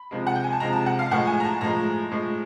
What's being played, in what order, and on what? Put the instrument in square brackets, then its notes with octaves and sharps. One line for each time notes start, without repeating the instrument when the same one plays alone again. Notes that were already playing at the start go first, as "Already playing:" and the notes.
Already playing: [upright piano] B5
C3 F3 G#3
F#5
G5
G#5
A5
C3 F3 G#3 A#5
A5
F#5
F5
A2 F3 G#3 F#5
G#5
A#5
A5
A2 F3 G#3 A#5
A2 F3 G#3